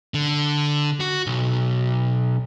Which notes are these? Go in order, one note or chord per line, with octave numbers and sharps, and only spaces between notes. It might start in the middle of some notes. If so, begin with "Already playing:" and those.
D3
F#4
B1